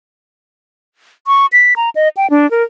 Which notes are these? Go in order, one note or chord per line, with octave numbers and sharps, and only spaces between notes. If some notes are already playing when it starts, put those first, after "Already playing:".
C#6
B6
A#5
D#5
G5
D4
A#4